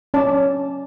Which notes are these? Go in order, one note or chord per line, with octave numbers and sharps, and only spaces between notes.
C#4 D5 A5